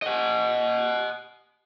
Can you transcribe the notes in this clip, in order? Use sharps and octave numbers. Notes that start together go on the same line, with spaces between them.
D#5 F#5